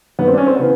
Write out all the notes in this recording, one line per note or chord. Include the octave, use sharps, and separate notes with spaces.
G2 D#3 B3
C4
D4
C#4
C4
C#3 E3 B3